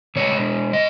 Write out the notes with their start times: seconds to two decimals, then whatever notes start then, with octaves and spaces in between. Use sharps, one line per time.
0.16 B2 G#3 C#5
0.73 D#5